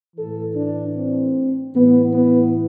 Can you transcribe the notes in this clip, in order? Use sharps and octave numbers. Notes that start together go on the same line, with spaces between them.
A2 E3 A4
D4
C4
A2 E3 B3
B3